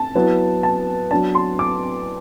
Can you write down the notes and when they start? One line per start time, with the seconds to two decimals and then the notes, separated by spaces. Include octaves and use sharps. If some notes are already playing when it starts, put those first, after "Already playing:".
Already playing: A5
0.15 F#3 B3 E4
0.63 A5
1.11 F#3 B3 D4 A5
1.35 C6
1.59 D6